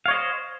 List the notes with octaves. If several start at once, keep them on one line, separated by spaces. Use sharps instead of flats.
C5 C#5 D#5 F5